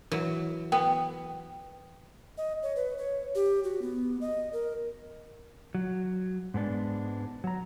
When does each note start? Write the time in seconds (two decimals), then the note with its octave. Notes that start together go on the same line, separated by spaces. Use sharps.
0.12 E3 F#3
0.72 B3 G5
2.38 D#5
2.63 C#5
2.76 B4
2.98 C#5
3.35 G4
3.64 F#4
3.82 B3
4.21 D#5
4.53 A#4
5.75 F#3
6.54 G#2 G#3 B3 D4
7.44 F#3 A#5